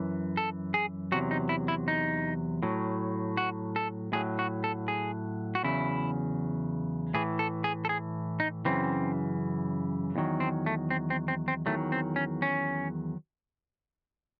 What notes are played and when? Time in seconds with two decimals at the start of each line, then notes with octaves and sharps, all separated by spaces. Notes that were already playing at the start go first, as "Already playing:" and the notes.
Already playing: F#2 E3
0.37 A4
0.74 G#4
1.12 E2 C3 F#3 F#4
1.31 D#4
1.49 E4
1.68 E4
1.88 D#4
2.63 A2 F#3
3.37 F#4
3.76 A4
4.13 A2 F#3 G#4
4.39 F#4
4.64 A4
4.88 G#4
5.55 F#4
5.63 E2 C#3 F#3 E4
7.14 A2 E3 G#4
7.39 A4
7.64 G#4
7.85 A4
7.89 G#4
8.40 D#4
8.65 F#2 C#3 E3 C4
10.16 E2 D#3 F#3
10.40 C4
10.66 A3
10.90 C4
11.10 C4
11.28 C4
11.48 C4
11.66 E2 D#3 F#3 A3
11.92 C4
12.16 C#4
12.42 C#4